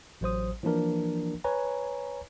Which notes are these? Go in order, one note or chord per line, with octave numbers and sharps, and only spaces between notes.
A1 F#3 C5 D#6
E3 F3 A#3 D4 A#4
B4 C#5 G#5 A#5